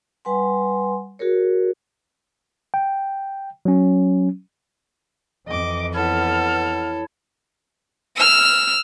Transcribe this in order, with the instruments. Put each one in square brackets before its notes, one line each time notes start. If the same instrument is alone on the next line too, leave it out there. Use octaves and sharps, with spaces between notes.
[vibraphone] G3 B4 F#5 G#5 C6
F#4 G#4 A#4 C#5
[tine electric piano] G5
F#3 C#4
[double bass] F2 E3 [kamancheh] D#5 D6
[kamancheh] B3 F6 [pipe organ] E4 C#5 [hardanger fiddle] A4
[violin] E6 F6